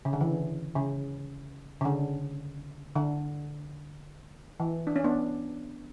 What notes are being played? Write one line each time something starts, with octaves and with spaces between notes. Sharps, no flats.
C#3
D3
E3
C#3
C#3
D3
D3
E3
D4
C#4
B3 D4